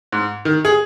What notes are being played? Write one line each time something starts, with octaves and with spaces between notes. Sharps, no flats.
G#2
D#3
G#4